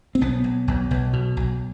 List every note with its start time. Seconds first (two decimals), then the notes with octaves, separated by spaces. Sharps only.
0.15 C4
0.21 B1 B3
0.44 B1
0.68 B1
0.91 B1
1.13 B2
1.37 B1